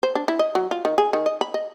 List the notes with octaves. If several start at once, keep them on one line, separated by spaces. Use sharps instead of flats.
C5
D4
E4
D#5
F#3
F4
D#3
G#4
D#3
D#5
B5
D#5